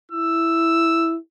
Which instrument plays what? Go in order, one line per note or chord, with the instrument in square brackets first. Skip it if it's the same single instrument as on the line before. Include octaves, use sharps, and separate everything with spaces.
[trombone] E4 [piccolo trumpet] E6